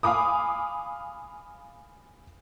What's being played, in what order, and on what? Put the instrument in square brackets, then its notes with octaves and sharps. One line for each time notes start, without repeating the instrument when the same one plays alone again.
[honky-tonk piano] F5 G#5 B5 D6 D#6